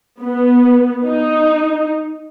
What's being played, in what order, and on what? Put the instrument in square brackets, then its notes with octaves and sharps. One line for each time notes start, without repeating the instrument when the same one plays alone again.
[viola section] B3
D#4